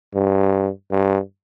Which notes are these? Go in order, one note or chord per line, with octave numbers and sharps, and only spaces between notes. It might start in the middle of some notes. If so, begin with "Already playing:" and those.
G2
G2